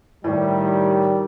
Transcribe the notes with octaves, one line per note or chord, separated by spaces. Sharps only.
A2 D#3 G3